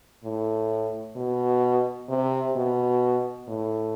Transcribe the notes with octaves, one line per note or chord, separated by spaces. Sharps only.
A2
B2
C3
B2
A2